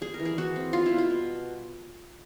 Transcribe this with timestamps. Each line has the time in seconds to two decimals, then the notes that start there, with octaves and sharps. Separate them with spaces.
0.01 G3 G#4
0.14 A#4
0.20 E3
0.25 G#4
0.38 E3 F#4
0.56 C4
0.73 G3 F4
0.86 E4
0.91 B2
0.98 F4
1.10 B2